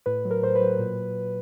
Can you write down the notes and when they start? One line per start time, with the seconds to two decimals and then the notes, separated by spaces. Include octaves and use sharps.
0.06 A2 B4
0.25 F#3
0.31 A#4
0.43 A2 C5
0.55 B4
0.61 F#3
0.79 A#2